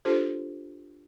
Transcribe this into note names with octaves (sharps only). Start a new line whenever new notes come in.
D4 F4 G4 A4 C5